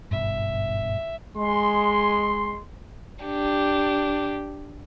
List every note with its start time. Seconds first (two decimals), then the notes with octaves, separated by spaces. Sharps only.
0.11 G#1 G2 B2 E5
1.37 G#3 C6
3.25 D4 G4